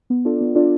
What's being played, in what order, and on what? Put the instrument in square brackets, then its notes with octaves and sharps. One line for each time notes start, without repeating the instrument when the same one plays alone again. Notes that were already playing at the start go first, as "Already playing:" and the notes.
[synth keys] B3
D4 F4 A4 D5
B3
D4 F4 A4 D5